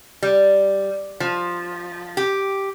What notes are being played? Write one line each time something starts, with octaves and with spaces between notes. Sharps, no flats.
G3
F3
G4